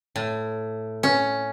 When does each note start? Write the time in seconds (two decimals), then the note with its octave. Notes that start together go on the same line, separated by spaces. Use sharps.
0.16 A2
1.03 C#4